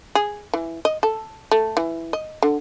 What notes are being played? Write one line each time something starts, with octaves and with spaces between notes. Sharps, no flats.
G#4
E3
D#5
A4
A3
E3
D#5
D3